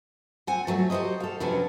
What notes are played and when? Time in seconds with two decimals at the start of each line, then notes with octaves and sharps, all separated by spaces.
0.47 C4 F#5 G#5
0.67 F3 F#3 A3
0.90 F#4 G4 B4 C5 D#5
1.20 A4 F5
1.40 F2 C3 F#3 B3 C#4 D4